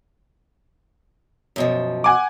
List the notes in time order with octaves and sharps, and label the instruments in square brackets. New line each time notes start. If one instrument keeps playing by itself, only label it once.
[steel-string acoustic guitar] F#2 B2 F3
[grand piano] F#5 G#5 D6